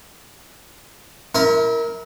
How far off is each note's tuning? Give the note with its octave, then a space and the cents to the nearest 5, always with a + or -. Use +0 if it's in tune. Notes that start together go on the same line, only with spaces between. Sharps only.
E4 -35 A#4 +0